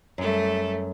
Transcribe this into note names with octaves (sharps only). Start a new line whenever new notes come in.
F#2 G3 A3